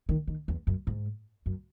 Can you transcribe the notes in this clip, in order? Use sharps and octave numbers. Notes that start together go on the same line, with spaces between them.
D#3
D#3
E2
F#2
G#2
F#2